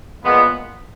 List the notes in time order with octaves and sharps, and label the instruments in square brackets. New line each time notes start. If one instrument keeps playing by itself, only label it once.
[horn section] A#2 F3 G#3 B3